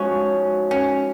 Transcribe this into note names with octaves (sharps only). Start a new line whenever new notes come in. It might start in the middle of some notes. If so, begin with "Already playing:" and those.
Already playing: F3 G#3 C#4 D#4 F#4 C#5
C#4